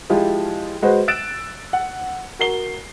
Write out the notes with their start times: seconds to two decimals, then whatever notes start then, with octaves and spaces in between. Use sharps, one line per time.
0.10 F3 G#3 E4 F4 G4
0.82 G#3 F#4 B4 C5
1.08 E6 F#6 A6 D7 E7
1.73 F#5
2.39 F#4 A#4 C7 G7